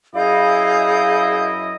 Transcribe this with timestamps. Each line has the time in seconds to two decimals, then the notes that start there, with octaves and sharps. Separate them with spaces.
0.15 F#2 E4 G#4 D#5 F5 G6